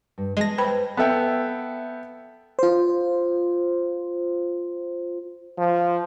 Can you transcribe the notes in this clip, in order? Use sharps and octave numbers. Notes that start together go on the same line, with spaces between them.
G2
E3 G#3 G5 A5 A#6
B4 C5 G5 B5
B3 A4 E5 G5
F4 C5
F3